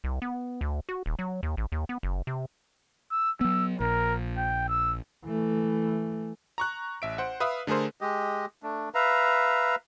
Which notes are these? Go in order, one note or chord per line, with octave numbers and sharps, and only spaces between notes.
C2
B3
D2
F#4
D#1
F#3
D#2
A1
D#2
B3
F#1
C3
E6
F#3 B3 E6
A#1 A#4
G5
E6
E3 A3
A#5 C#6 F#6
A1 E5 D7
C5 F#5
B4 E5 F5 D#6
D3 A3 G#4 A#4 C5
G#3 G4 D#5
A3 D4
B4 E5 F5 A#5